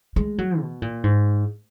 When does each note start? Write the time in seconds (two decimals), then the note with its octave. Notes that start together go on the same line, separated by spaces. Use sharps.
0.16 G#3
0.38 F#3
0.61 B2
0.82 A#2
1.04 G#2